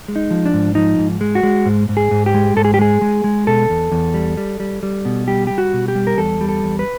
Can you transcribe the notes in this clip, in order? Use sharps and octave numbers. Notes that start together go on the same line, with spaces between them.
G#3
D#4
F3
D4
G#2
F3 D#4
G#2
G#3
F#4
G#3
G#2
G#2
G#4
G#2
G4
G#3
G#2 A4
G#4
G4
G#3 G#4
G#3
G#3
B2 A4
E2
E2
G3
G3
G3
G3
B2
G3 G4
G3 G4
F#4
B2
G4
G3
A#4
E2 A4
G3
A4
E2
B4